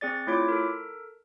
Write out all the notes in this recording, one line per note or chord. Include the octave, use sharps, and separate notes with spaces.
C4 G#4 D5 A6
A3 E4 F4 C#5 D6
A4 A#4